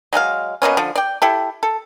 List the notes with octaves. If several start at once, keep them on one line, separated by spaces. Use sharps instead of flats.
F#3 G#3 A4 F5
B2 A#3 B3 C#4
D3 F3
D5 G5
E4 G4 A4
A4